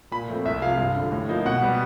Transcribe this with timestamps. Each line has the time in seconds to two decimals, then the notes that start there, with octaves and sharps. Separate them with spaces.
0.11 A#2 B5
0.28 F3 A3 C4
0.45 C2 E5
0.62 C3 F3 G#3 F5
0.78 G2
0.96 D3 F3
1.12 A2
1.29 F3 A#3 D#4
1.45 B2 F#5
1.62 G3 B3